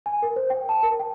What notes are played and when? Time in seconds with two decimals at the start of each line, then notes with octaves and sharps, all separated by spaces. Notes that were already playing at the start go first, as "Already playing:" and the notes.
0.06 G#5
0.22 A#4
0.36 C5
0.50 G5
0.69 A5
0.83 A#4
1.00 G5